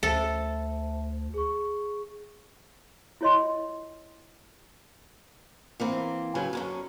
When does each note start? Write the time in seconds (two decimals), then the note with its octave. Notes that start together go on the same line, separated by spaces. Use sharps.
0.03 D2 A4 C5 E5 A5
1.34 G#4 C#6
3.21 E4 F4 C#5 D#5 C6
5.80 E3 A#3 C4
6.35 C#3 F#3 B4 G#5
6.53 F#2 D3 C#4